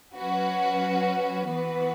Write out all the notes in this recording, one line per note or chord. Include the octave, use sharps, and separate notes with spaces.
F#3 C#4 F#4 B4
E3 B3 F#4 B4